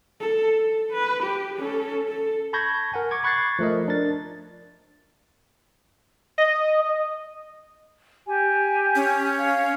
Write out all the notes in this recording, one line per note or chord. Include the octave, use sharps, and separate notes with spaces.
A4
A4
B4
G4
C#4 A4
A4
A5 B5 C#6 G6 G#6 A#6
A#4 F#5 G#5
C#6 D6 G#6
B5 C#6 F#6 G#6 A6 C7
F3 A3 A#4 D#5
D4 A#4 A6
D#5
G4 G#5
C#4
F5